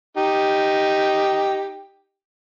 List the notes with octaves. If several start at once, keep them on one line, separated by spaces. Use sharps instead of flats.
D#4 G4